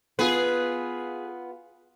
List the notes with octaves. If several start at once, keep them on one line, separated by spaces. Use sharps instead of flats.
B3 F4 G#4 B4